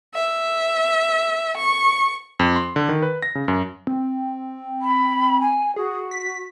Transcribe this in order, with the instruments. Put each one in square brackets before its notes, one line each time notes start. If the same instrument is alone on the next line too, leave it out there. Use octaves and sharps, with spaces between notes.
[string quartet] E5
C#6
[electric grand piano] F2
C6
D3
D#3
B4
A#6
C#3
F#2
[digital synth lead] C4
[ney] B5
G#5
[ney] F#4 [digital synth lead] G#4
[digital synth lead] B6